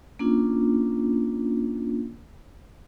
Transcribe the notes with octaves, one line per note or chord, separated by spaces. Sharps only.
A#3 C#4 D4 F4